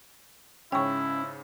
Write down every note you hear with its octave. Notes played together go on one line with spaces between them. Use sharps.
G#2 C#3 C#4 E4 G5 C#6